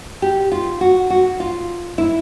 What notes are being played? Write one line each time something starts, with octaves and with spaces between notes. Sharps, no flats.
G4
F4
F#4
F#4
F4
E4